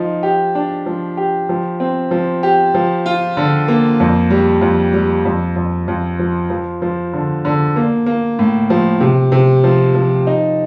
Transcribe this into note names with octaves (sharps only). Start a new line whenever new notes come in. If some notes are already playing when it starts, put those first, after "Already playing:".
Already playing: F3 D#4
G4
D4
F3
G4
F3
C4
F3
G4
F3
F4
D3
A#3
F2
G3
F2
G3
F2
F2
F2
F3
F3
F3
D3
D3
A#3
A#3
A2
F3
C3
C3
F3
F3
D#4